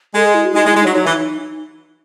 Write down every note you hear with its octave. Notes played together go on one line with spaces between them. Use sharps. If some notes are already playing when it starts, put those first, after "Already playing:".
G#3 A4
G#4
E4
F#4
G#3 D#4
G#3
E4
G#3
F#3 D#4
F#3 D#4
E3